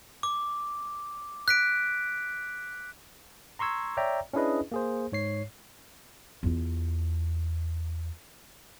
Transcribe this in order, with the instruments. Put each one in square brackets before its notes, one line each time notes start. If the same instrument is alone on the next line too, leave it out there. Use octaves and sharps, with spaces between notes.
[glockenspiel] D6
F#6 B6 D7
[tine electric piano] A#5 C6 C#6 E6 G#6
C#5 D5 E5 G5 A#5
C#4 D4 E4 G#4 B4 D#5
A#3 G#4 C5
G#2 C#5 C7
[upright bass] E2 F4